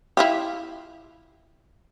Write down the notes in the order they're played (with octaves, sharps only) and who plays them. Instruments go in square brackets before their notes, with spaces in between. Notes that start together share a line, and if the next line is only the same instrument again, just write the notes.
[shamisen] E4 F4 G4